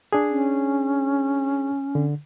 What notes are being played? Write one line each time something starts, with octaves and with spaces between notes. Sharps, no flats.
D4 G#4
C#4
D3